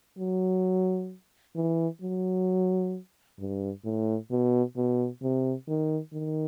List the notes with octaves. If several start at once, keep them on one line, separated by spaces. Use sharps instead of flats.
F#3
E3
F#3
G2
A2
B2
B2
C3
D#3
D#3